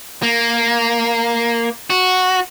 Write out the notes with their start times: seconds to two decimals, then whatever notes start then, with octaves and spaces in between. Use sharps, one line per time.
0.23 A#3
1.90 F#4